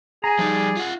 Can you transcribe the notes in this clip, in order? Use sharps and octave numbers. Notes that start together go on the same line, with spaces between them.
G#4 G#5 A#5
F3 G3 D#4 D5
F4 F#5